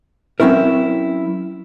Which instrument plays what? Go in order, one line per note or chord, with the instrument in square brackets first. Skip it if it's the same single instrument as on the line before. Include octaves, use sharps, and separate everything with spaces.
[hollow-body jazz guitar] F#3 C4 C#4 E4 A#4